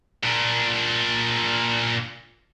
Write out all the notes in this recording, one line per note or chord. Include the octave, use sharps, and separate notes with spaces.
A#2 D4